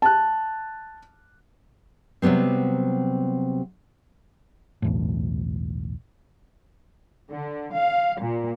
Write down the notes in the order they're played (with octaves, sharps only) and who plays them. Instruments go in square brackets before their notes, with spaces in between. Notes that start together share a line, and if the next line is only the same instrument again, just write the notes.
[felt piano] A5 F#6
[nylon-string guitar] C3 F#3 G3 B3 C4
[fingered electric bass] B1 E2 A2
[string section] D3
F5
A#2